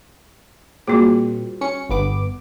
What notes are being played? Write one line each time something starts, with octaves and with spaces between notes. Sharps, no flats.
A#2 G3 C4 F#4 G#4
C#4 C#7
G1 B3 D6